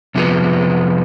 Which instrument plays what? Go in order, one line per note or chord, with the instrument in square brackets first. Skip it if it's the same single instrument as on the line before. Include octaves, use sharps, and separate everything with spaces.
[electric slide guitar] F2 C3 F3 G#3 B3